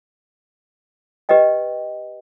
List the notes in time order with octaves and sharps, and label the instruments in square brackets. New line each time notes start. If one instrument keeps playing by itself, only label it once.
[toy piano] G4 B4 D5 D#5 G5